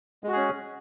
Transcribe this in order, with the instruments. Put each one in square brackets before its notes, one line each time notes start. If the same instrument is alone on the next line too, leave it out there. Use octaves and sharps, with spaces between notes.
[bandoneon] G#3
F#4
G#4
C#4